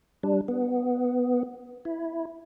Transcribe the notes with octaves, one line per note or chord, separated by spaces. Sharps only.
G3 D4
B3
E4